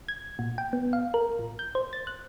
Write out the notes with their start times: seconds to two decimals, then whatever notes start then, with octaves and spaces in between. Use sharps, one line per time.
0.08 G#6
0.39 A#2
0.58 G5
0.73 B3
0.93 F5
1.14 A#4
1.39 A1
1.59 G6
1.75 C5
1.93 A6
2.07 F#6